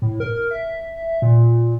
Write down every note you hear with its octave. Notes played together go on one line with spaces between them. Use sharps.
A2
A#4
E5
A#2